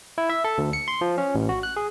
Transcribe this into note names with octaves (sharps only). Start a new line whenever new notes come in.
E4
E5
A4
D2
C#7
C6
F3
C#4
A1
F#4
F#6
G#4